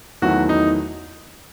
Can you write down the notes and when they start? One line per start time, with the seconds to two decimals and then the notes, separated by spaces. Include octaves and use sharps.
0.22 E2 D#3 F#3 A3 E4 F#4
0.49 D#4